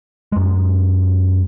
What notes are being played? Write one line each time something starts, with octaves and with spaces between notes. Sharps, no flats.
F#2 G#3